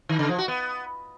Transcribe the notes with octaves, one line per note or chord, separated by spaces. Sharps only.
D#3
C#3
F3
F#4
B3